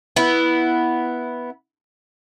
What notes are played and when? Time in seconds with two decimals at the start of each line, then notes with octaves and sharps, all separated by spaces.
0.16 B3 E4